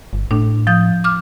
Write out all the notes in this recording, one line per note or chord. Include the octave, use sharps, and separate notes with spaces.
G1
A2 D4
F3 D#6 G6
D6 F6